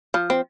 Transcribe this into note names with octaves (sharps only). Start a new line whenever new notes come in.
F3
C4